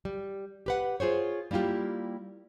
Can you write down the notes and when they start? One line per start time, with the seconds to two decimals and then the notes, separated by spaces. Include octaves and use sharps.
0.05 G3
0.66 G4 B4 F#5
1.00 F4 G#4 C5 C#5
1.51 G3 A#3 E4 F4 G4